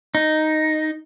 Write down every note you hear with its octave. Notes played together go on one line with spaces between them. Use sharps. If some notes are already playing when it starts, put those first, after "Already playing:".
D#4